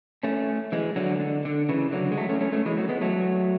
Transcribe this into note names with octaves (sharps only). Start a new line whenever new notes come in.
A3 C#4
E3 G#3
D3 F#3
D3
D3
C#3 E3
D3 F#3
G#3
F#3 A3
A3 C#4
A3 C#4
A3 C#4
E3 G#3
F#3 A3
G#3 B3
F#3 A3